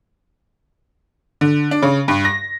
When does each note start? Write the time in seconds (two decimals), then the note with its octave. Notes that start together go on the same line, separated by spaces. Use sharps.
1.41 D3
1.71 D4
1.82 C#3
2.08 G2
2.25 A#6